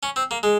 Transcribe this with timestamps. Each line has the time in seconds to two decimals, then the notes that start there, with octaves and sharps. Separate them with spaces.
0.03 C#4
0.16 C4
0.31 A#3
0.43 G#3